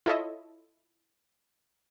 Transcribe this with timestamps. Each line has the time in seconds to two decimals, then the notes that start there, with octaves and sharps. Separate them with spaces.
0.06 E4 F4 A4 C#5 D#5 E5